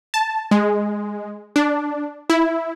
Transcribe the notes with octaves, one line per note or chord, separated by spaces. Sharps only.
A5
G#3
D4
E4